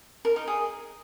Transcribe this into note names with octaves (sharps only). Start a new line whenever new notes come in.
A#4
D#4
G#4